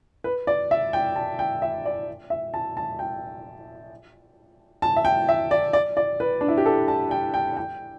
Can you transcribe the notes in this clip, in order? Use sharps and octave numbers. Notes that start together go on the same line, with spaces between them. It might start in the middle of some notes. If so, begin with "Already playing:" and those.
B4
D5
E5
G5
A5
G5
E5
D5
E5
A5
A5
G5
A5
E5
G5
E5
D5
D5
D5
B4
D4
E4
G4
A4
A5
G5
G5
G5